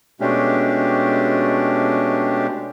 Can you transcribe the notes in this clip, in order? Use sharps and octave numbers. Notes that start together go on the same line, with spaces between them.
B2 G#3 A3 C#4 D4 G4